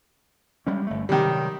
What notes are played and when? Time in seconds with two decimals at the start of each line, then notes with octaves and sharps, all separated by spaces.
0.67 G3 G#3 C#4
0.87 G1 A3
1.09 C3 D#3 F#3 G3